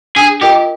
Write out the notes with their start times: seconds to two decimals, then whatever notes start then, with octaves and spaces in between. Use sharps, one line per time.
0.16 D4 G#4
0.41 F4 G4 A#4 D#5 G5